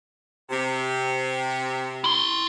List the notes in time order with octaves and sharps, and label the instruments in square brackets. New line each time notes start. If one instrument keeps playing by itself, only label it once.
[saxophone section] C3
[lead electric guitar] E4 C6